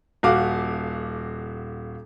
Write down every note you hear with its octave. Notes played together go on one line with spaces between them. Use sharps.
D#1 F#4 F5 D6